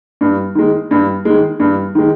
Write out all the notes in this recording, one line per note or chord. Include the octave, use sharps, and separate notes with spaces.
G2
D#3 G#3
G2
D#3 G#3
G2
D#3 G#3